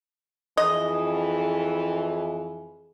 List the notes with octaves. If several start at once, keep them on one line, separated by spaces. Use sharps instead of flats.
F2 E3 G#4 D#5